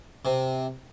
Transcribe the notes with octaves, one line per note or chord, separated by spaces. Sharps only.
C3